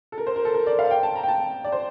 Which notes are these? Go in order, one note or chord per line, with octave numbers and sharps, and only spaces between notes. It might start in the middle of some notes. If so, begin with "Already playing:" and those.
A4
A#4
C5
A#4
A4
A#4
D5
F5
G5
A5
A#5
G5
A5
D5
C5